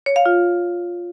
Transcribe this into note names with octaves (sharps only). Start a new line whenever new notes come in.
C#5
F5
F4